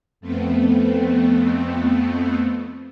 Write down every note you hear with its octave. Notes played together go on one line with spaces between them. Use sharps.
F2 A3 B3 C4